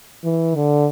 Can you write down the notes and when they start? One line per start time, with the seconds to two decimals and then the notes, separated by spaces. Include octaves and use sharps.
0.24 E3
0.55 D3